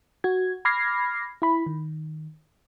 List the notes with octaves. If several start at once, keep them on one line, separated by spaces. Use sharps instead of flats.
F#4 G#6
B5 D6 F6 G#6 A#6 C7
E4 B5
D#3